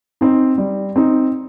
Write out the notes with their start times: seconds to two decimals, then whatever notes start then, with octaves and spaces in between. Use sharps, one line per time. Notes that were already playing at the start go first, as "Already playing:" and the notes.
0.21 C4 D#4
0.58 G3
0.96 C4 D#4